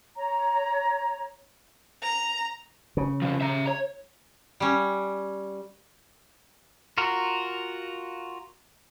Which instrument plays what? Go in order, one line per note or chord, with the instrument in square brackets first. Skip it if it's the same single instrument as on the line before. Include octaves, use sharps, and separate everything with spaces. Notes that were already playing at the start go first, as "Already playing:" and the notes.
[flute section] C#5 A#5
[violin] A#5
[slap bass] C#3
[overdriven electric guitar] C3 F3
E5 A#5
C#5
[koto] G3 C#4
[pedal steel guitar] F4 F#4 A#4